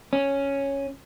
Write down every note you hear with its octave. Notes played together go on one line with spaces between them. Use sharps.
C#4